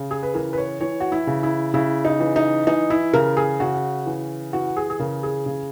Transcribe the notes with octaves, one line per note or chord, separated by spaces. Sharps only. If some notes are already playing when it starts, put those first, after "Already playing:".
Already playing: C#3
G#4
B4
E3 A#4
B4
C#5
E3 C#5
F#4
E4
C#3
E4
C#3 E4
D#4
E3
D#4
E3 D#4
E4
C#3 A#4
G#4
C#3 F#4
E3
E3 F#4
G#4
G#4
C#3 A#4
G#4
C#3